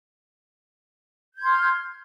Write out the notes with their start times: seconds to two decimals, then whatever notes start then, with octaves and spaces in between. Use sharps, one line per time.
1.34 G6
1.38 G#6
1.42 C6
1.46 F6